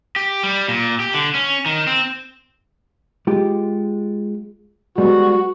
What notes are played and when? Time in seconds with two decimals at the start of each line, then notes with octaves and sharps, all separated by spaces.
0.16 G4
0.43 G3
0.68 A#2
1.00 G4
1.14 D3
1.35 C#4
1.66 D#3
1.87 C4
3.27 G#3 F4 G4
4.98 G3 G#3 B3 F#4